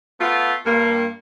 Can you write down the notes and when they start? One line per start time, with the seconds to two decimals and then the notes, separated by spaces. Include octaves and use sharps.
0.20 A3 B3 F4
0.66 G2 A#3